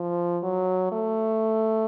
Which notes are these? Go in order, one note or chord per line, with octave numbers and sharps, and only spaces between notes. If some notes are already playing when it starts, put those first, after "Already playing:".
Already playing: F3
F#3
A3